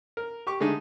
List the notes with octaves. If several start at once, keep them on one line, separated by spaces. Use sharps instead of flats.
A#4
G4 C#6 D6
D3 G#3 A3 D#4